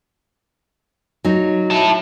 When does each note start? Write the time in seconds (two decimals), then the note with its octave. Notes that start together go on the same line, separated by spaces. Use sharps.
1.24 F#3 D#4
1.70 E4 A5